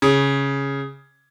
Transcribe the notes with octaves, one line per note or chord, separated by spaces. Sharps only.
C#3